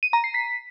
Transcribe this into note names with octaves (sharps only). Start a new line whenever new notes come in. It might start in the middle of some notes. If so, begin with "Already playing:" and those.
D#7
A#5
C7
B6